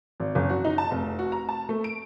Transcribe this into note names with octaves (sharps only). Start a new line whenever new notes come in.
G#1
F#1
F#4
D#4
A5
F1
F#4
A#5
A5
A3
D7